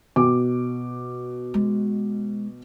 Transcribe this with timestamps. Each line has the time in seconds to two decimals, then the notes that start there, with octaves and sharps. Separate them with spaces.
0.16 B2 D6
1.54 G#3